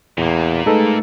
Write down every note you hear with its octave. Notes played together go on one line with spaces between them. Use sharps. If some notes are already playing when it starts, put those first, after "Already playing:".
E2 A#2 A#3
G#3 A3 D#4 A4 B4